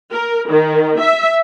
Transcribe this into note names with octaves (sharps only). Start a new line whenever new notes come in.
A#4
D#3
E5